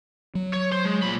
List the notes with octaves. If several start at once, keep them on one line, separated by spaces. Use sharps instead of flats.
F#3
C#5
C5
G#3
A#2 B5